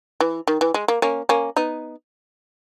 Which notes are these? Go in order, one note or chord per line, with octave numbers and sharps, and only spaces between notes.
E3
D#3
E3
G#3
A#3
A#3 C#4
A#3 C#4
B3 D#4